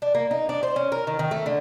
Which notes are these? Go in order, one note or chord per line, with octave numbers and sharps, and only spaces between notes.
D4
A#3
D#4
D4
C5
C#4
A#4
D#3
D#3
A3
D3